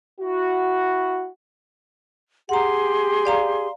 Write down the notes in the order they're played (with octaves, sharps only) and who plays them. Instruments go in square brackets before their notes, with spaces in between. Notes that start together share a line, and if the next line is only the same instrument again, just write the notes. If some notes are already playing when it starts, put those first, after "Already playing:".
[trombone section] E4 F#4
[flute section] G4 G#4 C6 [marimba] F#5 A#5
[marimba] D5 F5 A#5